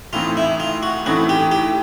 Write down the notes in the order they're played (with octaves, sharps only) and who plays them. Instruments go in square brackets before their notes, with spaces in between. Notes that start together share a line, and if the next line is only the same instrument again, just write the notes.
[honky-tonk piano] A2 E3 A3 C4 D#4 [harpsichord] F4
[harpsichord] E4
F4
F#4
[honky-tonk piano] A2 E3 A3 C4 D#4 [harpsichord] F#4
[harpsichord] G4
G4